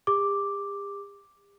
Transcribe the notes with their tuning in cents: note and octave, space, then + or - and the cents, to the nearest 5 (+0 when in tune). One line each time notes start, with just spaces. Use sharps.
G4 +45 D6 +0